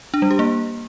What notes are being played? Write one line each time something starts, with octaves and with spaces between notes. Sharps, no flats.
D4
G3
G4
A#3